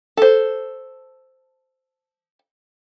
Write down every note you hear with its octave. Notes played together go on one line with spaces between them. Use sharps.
A4 C5